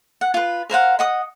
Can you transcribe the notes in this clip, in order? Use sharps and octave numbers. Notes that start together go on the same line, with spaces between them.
F#5
F4 B4
A#4 C5 F5 F#5
D#5 F#5 D#6